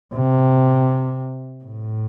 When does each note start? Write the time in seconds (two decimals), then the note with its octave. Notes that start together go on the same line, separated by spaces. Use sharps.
0.14 C3
1.64 A2